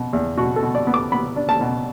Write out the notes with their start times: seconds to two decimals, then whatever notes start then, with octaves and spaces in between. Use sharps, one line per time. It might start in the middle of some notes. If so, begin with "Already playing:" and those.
Already playing: B2
0.13 E2
0.38 B2 F#4
0.56 A4
0.63 B2
0.75 D5
0.87 B3
0.94 D6
1.12 B3 B5
1.36 D4
1.49 A5
1.61 B2